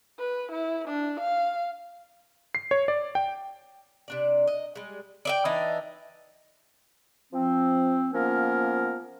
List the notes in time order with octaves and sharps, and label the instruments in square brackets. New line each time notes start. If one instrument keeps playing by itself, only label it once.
[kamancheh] B4
E4
D4
F5
[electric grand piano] C7
C#5
D5
G5
[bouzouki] C3 D4 D5
D#5
G3 G#3
D5 E5 G5
E3 D4 D#4
[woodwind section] F3 C4
F3 A#3 B3 C#4 A#4